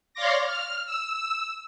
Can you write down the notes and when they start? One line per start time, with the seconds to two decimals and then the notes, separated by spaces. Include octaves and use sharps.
0.14 C#5 D5 F5 C6 D6 A#6
0.45 F6
0.86 E6